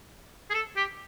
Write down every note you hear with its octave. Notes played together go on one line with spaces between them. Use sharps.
G#4
A4
G4